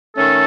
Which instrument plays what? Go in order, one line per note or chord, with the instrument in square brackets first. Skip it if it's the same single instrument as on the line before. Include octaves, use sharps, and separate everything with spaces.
[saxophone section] D#3 A3 C#4 [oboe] A4